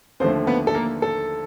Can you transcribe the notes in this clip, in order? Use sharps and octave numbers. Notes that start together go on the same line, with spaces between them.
D#2 D3 F3 A3 C4 C5
B3 B4
A4
A#3 A#4
A4